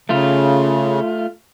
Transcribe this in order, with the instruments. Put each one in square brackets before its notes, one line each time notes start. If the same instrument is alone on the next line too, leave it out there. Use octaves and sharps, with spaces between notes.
[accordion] C#3 [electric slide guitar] A3 F4